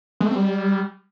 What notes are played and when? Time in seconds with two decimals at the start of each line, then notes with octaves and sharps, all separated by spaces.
0.21 G#3
0.26 A3
0.31 C4
0.36 G3